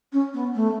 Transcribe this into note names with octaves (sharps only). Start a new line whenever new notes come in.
C#4
B3
A3